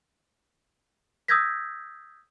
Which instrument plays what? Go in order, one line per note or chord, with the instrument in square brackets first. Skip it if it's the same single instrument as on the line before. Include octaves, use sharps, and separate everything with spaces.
[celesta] D#6 E6 G6 G#6 A#6 B6